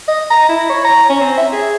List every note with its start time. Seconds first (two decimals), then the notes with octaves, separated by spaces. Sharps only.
0.08 D#5
0.30 A#5
0.49 E4
0.70 C#5
0.84 A#5
1.09 C#4
1.21 C4
1.37 E5
1.53 G#4